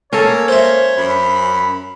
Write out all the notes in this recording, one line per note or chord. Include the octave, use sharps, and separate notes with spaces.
A#3 C#4 A4 C#5
C5 E5
F#2 B5